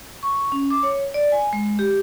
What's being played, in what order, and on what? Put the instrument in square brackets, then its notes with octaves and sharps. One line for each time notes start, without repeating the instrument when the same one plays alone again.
[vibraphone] C#6
C#4
D6
C#5
D5
G#5
G#3
G4